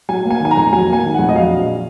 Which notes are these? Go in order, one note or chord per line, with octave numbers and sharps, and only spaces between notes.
F#3 G#5
A#3
G#5
D#3 G#5
A#5
F2
F#3 G#5
A#3
G#5
D#3
F2 F#5
D#5
F#3 F5
A#1